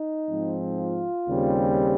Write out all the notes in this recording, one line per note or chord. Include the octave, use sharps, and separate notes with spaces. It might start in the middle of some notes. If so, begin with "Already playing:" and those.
Already playing: D#4
G#2 F3 C4
F4
D#2 C#3 G3 C4